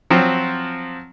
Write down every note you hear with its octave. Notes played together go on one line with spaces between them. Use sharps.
F3 F#3 C4